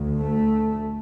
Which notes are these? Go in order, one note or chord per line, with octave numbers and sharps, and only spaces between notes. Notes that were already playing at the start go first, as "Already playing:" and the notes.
Already playing: D2
A3